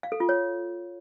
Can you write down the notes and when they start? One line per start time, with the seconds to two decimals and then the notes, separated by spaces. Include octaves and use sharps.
0.03 F5
0.12 A4
0.20 F4
0.29 C#5